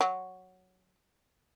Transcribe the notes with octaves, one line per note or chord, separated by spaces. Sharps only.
F#3